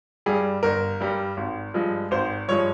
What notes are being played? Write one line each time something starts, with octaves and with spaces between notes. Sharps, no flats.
G2 G3 G#4
G1 A#4
G2 G3
G#1
G2 F3 G#3
G#1 C5
G2 F3 G#3 C#5